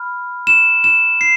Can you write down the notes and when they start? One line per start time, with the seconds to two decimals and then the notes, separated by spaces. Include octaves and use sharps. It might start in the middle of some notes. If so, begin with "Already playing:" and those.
Already playing: B5 F6
0.47 E7
0.84 E7
1.21 C7